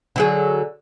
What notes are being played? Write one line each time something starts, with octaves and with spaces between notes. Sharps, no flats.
D3 F#3 G#4